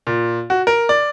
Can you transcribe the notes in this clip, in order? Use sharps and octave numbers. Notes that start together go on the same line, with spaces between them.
A#2
F#4
A#4
D5